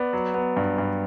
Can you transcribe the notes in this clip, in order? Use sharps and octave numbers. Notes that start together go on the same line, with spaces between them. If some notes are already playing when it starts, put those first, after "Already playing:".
Already playing: B3 D5
F#3
B3
G2
G2